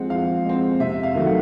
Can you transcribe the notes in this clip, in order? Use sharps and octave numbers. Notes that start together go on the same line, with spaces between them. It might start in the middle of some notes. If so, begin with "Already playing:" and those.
Already playing: F3 G#3 C4 F#5
F3 F5
G#3 C4
C3 E5
F5
D#3 F#3 A3
F#5